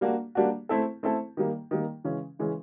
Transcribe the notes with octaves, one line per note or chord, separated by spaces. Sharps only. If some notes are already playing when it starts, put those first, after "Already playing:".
G3 A#3 D4 F#4
G3 A#3 D4 F#4
A3 C4 E4 A4
A3 C4 E4 A4
D#3 G3 A#3
D#3 G3 A#3
C#3 E3 G#3 C#4
C#3 E3 G#3 C#4